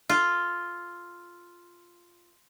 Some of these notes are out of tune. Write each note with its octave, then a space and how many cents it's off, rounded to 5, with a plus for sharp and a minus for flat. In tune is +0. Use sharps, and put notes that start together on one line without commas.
F4 +0 A4 +0